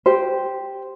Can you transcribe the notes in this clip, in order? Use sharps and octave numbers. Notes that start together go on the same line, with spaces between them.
G4 C5